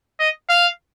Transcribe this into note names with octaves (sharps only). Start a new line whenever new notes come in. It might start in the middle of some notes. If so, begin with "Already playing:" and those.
D#5
F5